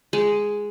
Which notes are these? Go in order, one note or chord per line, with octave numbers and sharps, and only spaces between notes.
G#3